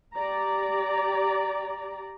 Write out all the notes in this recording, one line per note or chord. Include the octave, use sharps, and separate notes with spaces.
G4 D5 A#5